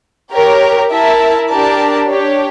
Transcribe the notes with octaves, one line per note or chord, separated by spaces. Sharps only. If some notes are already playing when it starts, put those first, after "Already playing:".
G4 A#4 C#5
E4 A#4 E5 A5
D4 G4 A#4 D5 A5
D4 G4 C#5